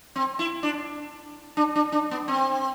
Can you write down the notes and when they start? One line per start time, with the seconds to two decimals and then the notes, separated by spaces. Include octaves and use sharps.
0.16 C4
0.39 E4
0.63 D4
1.57 D4
1.76 D4
1.92 D4
2.11 B3
2.28 C4